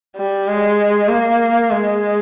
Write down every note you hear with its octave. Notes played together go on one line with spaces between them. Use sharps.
G3
G#3
A#3
G#3